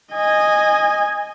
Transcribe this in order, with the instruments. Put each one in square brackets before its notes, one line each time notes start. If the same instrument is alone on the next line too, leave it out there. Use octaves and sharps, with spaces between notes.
[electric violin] D#5 G#5